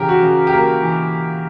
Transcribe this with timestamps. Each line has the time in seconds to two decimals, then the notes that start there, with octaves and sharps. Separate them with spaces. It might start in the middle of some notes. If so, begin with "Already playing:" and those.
Already playing: C#3 E3 G4 A#4
0.09 F#4
0.23 C#3
0.47 G4
0.52 A#3 A#4
0.83 E3